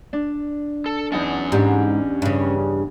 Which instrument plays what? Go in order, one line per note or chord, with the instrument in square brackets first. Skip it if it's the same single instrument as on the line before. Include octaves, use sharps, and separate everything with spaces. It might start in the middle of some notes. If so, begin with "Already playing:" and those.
[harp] D4
[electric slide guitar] A4
[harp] E2 D#4 A5 [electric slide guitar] C#4 F#5
[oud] G#2 [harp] D4 G4
[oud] G2 C#3